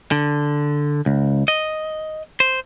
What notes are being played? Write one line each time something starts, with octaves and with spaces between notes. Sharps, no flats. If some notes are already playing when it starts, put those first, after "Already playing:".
D3
C#2
D#5
C5